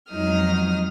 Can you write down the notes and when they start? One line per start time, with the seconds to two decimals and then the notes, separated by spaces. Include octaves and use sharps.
0.10 F2 F#3 G#3 D#4 D#6 F6